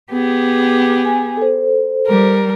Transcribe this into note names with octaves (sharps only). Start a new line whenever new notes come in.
B3 G4 G#4
G#5
A4 C5
G3 A#4